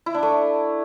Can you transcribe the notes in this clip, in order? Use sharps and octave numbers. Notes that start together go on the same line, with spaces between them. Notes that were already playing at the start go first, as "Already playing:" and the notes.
E4
D4
A3